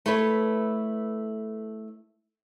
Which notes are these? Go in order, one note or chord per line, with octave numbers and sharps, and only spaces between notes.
A3 E4 A4 B4 C#5